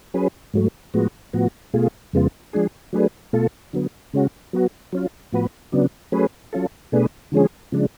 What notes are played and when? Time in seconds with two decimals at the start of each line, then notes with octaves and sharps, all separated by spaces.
0.14 F#3 C#4 G#4 B4
0.54 G#2 F#3 A3
0.94 A2 F3 G#3 B3 F#4
1.33 A2 F3 B3 F#4
1.74 B2 A3 F4 G#4
2.13 F2 C#3 G#3 B3 F4
2.53 F3 G#3 D4 G#4
2.93 F#3 A3 D4 G#4 B4
3.33 B2 A3 F4 A4
3.73 D3 F#3 B3
4.13 C#3 G#3 C#4 F#4
4.53 F#3 B3 F#4
4.92 F#3 C#4 F4
5.32 A2 F3 B3 F#4 B4
5.72 C#3 F#3 B3 D4
6.12 F#3 A3 C#4 G#4 B4
6.53 F#3 C#4 F4 A4
6.92 B2 A3 D4 G#4 B4
7.32 D3 F3 G#3 C#4 G#4
7.72 C#3 F3 G#3 D4